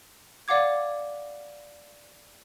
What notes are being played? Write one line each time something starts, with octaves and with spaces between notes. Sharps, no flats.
D5 F5 F#5 D6 G#6